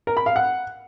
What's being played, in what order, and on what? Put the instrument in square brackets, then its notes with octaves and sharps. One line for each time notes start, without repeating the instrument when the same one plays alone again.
[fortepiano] A#4
B5
F5
F#5